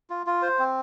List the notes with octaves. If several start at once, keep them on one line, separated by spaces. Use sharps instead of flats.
F4
F4
C5
C4